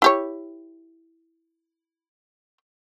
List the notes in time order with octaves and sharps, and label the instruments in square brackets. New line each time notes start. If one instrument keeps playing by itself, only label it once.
[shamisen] E4 G4 C#5